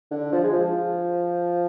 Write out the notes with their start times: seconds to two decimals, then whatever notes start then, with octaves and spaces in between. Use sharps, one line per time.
0.11 D3
0.32 F3
0.44 G#3
0.53 F3